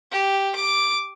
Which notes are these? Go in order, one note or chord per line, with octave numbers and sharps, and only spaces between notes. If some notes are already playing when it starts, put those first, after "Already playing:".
G4
D6